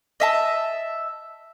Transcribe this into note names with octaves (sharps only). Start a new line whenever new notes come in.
D#5 E5 A5